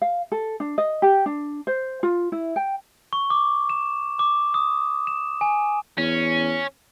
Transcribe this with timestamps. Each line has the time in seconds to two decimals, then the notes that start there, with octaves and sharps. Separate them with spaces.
0.02 F5
0.32 A4
0.60 D4
0.78 D#5
1.02 G4
1.26 D4
1.67 C5
2.03 F4
2.32 E4
2.56 G5
3.13 C#6
3.30 D6
3.69 E7
4.19 D6
4.54 D#6
5.07 E7
5.41 G#5
5.98 E2 C#4